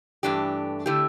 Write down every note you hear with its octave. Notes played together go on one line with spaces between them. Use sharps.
G2 E3 A3 D4 G4
D3 A3 E4 G4